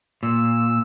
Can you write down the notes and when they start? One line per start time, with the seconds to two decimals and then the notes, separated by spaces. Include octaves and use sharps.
0.23 A#2 E6